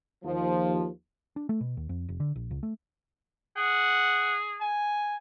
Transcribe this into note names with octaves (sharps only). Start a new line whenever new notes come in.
D#2 F3
D4
A3
B2
D#2
F2
F1
D3
A#1
C#2
A3
G#4 F#5
G#5